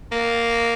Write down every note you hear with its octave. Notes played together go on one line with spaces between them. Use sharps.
A#3